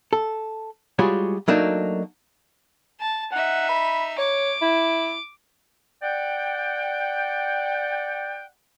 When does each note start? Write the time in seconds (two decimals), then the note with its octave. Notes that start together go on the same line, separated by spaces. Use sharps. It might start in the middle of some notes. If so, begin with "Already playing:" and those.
0.13 A4
0.99 G3 G#3 F4 F#4 G#4 C#5
1.48 F#3 A3 A#3 D4 D#4 F#4
3.00 A5
3.32 D#4 E5 F#5
3.69 B5
4.18 C#5 D6
4.62 E4
6.02 D5 F#5 G5